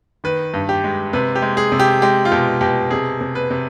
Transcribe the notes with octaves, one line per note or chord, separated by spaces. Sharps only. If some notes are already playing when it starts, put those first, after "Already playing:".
D#3 B4
G2
G4
G#3
C3 B4
G4
G#3
G#4
C3
G4
G#3 G4
F4
B2 G4
B2 G4
C3 G#4
C3
B4
C3